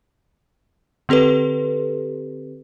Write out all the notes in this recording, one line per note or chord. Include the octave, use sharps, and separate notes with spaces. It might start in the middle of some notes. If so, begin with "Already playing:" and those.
D3 C4 G4 A4 B4